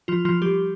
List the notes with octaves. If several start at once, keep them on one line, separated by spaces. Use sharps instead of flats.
F3 F4
F3 F4
G3 G4